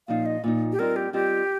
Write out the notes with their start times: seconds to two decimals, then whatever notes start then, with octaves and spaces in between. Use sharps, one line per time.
0.08 A#2 F3 D#4 F5
0.26 D#5
0.44 A#2 F3 D#4
0.72 G4
0.79 G3 C4 F4 A#4 D#5
0.96 G4
1.13 G3 C4 F4 G4 D#5